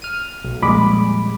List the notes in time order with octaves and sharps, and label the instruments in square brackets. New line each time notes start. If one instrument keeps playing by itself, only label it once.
[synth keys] F6 D#7
B1
[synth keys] F2 G3 G#3 [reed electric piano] A#2 B5 D6